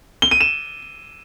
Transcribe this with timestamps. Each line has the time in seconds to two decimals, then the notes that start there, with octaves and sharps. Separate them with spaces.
0.22 G7
0.31 D#7
0.41 E7